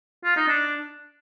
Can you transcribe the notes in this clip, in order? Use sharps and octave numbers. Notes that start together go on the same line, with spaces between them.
F4
D#4
D4